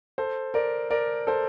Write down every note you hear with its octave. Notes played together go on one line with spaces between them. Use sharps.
A4 C5
A#4 D5
A#4 D5
A4 C5